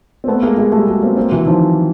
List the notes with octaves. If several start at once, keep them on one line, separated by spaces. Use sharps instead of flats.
C4
A3 B3
G#3 A#3
G#3 A#3
G3 A3
F#3 G#3
A#3 C4
A#3 C4
E3 F#3
D#3 F3